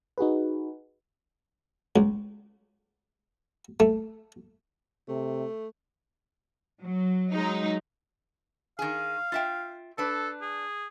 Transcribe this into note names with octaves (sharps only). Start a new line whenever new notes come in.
D#4 F#4 G#4 B4
C#2
A3
C3 A3
F#3
F#3 G#3 D#4
D#3 G#4 F5
F4 E5 G5
D4 A4 B4
G#4